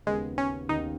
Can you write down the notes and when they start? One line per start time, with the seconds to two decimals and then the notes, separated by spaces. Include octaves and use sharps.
0.06 D#2 C#3 G#3 B3
0.38 C#4
0.69 D#2 C#3 B3 D#4